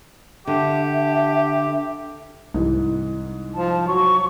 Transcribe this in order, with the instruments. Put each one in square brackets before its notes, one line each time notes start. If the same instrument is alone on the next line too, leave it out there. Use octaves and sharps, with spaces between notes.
[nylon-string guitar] D3 [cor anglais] G4 [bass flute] E5
[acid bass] C2 [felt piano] G#2 E3
[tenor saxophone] F3 [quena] A5
[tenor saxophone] F#3 [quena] C#6